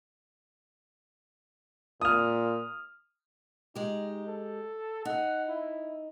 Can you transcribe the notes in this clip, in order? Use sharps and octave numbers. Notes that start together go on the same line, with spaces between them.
A#2 D#6 F6
G#3 D#4 G4
A4
D#4 F#5
E4